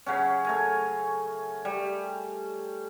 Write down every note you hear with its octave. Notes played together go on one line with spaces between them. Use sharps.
C#3 F#3 C#4
A3 A#4 G#5
G3